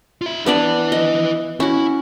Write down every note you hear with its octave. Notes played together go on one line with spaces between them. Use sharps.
F4 E5
B3 D4 E4 B4 D5
D#5
C#4 E4 F#4